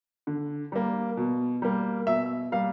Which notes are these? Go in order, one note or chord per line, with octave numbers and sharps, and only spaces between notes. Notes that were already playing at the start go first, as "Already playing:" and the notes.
D3
G3 A#3
B2
G3 A#3
B2 E5
G3 A#3 F5